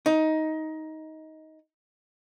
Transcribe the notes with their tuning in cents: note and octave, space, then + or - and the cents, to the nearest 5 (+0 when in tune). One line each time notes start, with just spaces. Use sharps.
D#4 +15